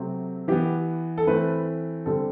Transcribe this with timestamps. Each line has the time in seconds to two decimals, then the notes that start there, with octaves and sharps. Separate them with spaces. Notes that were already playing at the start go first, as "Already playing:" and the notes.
Already playing: C3 F#3 A3 C4
0.48 E3 B3 G4
1.18 A4
1.27 E3 A3 C4 B4
2.06 D3 G3 C4 A4